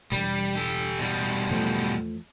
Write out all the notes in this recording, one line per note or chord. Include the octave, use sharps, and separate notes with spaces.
E1 G3
G4 A4
B2 G3
E2 F3 A3